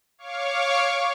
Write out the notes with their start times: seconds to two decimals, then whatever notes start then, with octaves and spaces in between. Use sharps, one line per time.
0.18 C#5 F5 C#6 D6